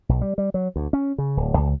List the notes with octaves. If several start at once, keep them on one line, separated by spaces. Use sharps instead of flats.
B1
G3
G3
F#3
D2
C#4
C#3
D1
C#2